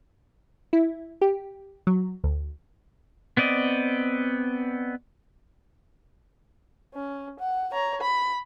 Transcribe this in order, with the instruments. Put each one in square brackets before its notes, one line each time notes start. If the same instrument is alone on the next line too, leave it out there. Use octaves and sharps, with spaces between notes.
[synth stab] E4
G4
F#3
D2
[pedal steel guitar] B3 C4 D5 D#5
[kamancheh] C#4
F#5
C#5 A#5
B5